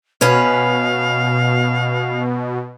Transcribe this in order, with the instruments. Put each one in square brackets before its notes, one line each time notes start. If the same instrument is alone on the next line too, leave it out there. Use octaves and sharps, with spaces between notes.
[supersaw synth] B2 [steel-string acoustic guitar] C#4 B4 [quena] F5